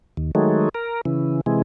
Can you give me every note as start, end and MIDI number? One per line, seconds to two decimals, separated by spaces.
0.17 0.31 39
0.35 0.69 51
0.35 0.69 54
0.35 0.69 56
0.35 0.69 57
0.75 1.01 70
1.05 1.41 49
1.05 1.41 52
1.46 1.62 48
1.46 1.62 52
1.46 1.62 56